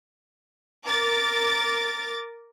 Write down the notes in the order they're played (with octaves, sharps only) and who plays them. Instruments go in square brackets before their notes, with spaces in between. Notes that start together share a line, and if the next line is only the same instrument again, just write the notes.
[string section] A#4 D6 A6